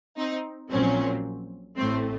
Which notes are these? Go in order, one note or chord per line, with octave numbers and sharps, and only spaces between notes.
C4 D#4
A#1 A#2 F#3 C4 C#4
A1 A2 A3 C4